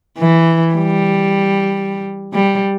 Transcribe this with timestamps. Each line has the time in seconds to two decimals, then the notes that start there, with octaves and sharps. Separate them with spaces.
0.19 E3
0.74 G3
2.33 G3